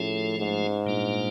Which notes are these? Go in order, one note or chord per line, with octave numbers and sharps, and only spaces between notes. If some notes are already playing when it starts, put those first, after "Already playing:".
Already playing: A2 F3 A3 C#4 F4 G#4
G#2
A#2 G3 A#3 D4 F4